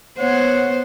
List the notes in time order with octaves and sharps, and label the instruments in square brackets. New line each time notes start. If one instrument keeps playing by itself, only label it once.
[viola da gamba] B3 C5 [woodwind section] C#5 F#5